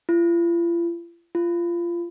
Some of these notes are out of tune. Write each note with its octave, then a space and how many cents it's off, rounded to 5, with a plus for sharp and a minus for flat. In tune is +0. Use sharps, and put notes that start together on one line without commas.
F4 -45
F4 -20